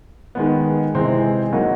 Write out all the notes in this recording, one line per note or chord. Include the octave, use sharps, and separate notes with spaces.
D#3 G#3 B3
C3 E3 G#3 C4
F#3 A#3 D#4